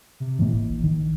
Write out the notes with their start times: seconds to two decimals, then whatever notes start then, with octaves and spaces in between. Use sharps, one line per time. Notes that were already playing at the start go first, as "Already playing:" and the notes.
0.20 C3
0.39 A2 E3 A#3
0.52 D#1
0.68 A#1
0.84 D#3